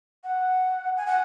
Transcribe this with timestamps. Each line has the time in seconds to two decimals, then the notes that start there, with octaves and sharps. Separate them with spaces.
0.24 F#5
0.97 G#5
1.07 F#5